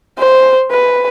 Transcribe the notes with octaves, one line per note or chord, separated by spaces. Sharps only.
C5
B4